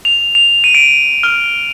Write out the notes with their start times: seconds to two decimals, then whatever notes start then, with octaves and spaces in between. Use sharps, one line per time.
0.05 F7
0.35 F7
0.64 D#7
0.74 D7
1.23 F6